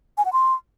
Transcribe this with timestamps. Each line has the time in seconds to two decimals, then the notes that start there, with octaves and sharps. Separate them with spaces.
0.18 G#5
0.25 F#5
0.33 C6